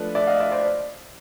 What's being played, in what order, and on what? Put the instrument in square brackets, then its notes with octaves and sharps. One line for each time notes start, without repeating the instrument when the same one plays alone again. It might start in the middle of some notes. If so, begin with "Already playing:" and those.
Already playing: [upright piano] F3 A3 D4 B4
D5 E5
D#5 F5
D5 E5
C5 D5